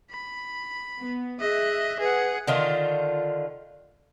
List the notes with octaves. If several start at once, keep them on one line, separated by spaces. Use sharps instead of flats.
B5
B3
G#4 D#5 E5 F#6
G#4 B4 F#5
D3 D#3 F4